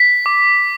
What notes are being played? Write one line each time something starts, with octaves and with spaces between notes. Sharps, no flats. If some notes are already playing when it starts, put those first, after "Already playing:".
Already playing: B6
D6